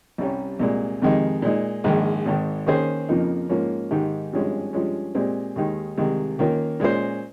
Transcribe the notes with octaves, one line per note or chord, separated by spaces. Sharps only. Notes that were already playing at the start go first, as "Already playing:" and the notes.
C2 C3 G3 C#4
C2 A#2 G#3
F2 C3 D#3 G#3 D#4
A#2 G#3 D#4
A#1 G#2 D#3 G#3
G#1 G#2 D#3
D#3 A#3 C#4 G#4 C5
F2 C#3 F3 A#3 D#4
G#2 F3 A#3 C#4
G#2 D#3 G#3 D#4 G4
G#1 G2 F3 G#3 C#4
G2 F3 G#3 C#4
A#2 G#3 C4 G4
D#2 D#3 G#3 D#4
C2 C3 D#3 G#3
D#3 A#3 C#4 F4 A#4
A#2 G#3 C#4 F4 C5